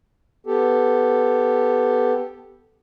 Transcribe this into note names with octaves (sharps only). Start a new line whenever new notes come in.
B3 G4 A4